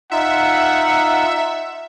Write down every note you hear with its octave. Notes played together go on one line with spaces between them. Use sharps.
D#4 F4 E5 F#5